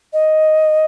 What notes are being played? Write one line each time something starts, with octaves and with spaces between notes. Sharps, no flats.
D#5